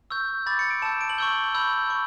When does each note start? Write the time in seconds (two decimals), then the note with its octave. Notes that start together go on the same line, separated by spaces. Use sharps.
0.10 C#6 E6 G6
0.46 B5 D6 G6 A6
0.59 C#7
0.71 D7
0.82 A5 E6 G6 E7
1.01 D7
1.09 F#7
1.18 C#6 E6 G6 G7
1.55 B5 E6 G6
1.90 C#6